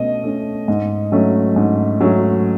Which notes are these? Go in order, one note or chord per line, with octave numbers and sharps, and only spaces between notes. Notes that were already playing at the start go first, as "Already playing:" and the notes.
Already playing: B2 A3 C#4 D#5
A3 C#4
G#2
F#3 A3 C#4
G#2
F#3 A3 C#4